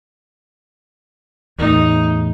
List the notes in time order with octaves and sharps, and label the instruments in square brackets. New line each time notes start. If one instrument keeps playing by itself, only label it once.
[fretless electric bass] E2 A2 [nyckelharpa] D#4